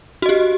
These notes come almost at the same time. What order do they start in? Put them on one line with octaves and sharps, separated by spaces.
F#4 D#5 G4